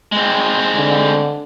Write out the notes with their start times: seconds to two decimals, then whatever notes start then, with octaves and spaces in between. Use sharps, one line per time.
0.12 G#3 C4
0.75 D3